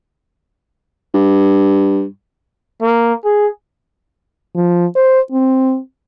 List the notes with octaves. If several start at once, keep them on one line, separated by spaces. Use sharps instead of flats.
G2
A#3
G#4
F3
C5
C4